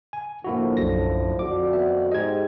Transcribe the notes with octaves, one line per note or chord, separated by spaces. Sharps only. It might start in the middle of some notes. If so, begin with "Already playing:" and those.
G#5
A2 D3 F3 A#3 E4 F#4
B1 F#2 A#6
F2 F#4 D5 D6
B3 E5
G#2 G4 D#5 G#6